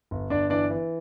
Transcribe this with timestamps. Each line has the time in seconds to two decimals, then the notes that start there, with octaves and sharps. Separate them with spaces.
0.11 G1
0.30 G1 D4 D5
0.50 E3 D4 D5
0.70 E3